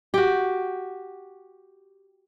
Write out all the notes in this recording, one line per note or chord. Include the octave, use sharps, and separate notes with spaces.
F#4 G4